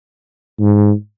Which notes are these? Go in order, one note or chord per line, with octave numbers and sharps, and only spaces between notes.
G#2